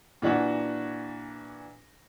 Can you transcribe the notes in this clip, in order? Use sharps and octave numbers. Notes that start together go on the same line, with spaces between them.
A#2 E3 D4 F#4